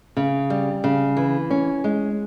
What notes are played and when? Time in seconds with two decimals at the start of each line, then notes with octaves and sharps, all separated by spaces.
0.17 C#3
0.50 G3
0.84 C#3
1.17 E3
1.50 C#4
1.84 G#3